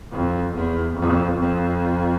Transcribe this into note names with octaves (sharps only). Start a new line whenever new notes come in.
F2
E2
F2
F2